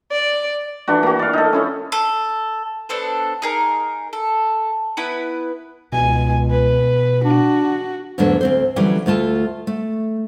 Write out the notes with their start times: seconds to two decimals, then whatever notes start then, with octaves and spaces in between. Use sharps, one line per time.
0.12 D5
0.88 E3 D4 F#4
1.03 A#3 F#4
1.19 D5 F5
1.33 D#4 A4
1.53 C#4 E4 C#5
1.92 A4
2.89 B3 D4 A4 C5
3.42 D#4 G#4 A#4
4.13 A4
4.97 B3 E4 B4 B5
5.92 C#2 B2 G#5
6.51 B4
7.24 D4 F#4
8.18 E2 G#2 D3 F#3 A3 D4
8.41 D2 C4 C5
8.76 D3 E3 F#3 G3 C#4
9.06 D2 A3 F4 A5
9.67 A3